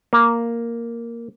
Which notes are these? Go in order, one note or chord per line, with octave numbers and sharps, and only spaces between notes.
A#3